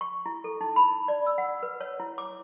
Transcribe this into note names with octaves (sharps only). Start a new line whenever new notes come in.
C#6
E4
A4
D#4
B5
D5
E6
F#5
B4
C#5
E4
D6